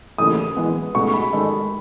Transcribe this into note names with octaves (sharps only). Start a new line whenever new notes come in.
D#2 C#3 E3 A3 D#6
E3 G#3 B3
C#2 B2 A3 D#4 F#4 C#6
B5
G#2 D#3 G#3 D#4 A4